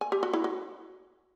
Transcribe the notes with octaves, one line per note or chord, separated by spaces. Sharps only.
G#5
G4
F#4
E4
F#4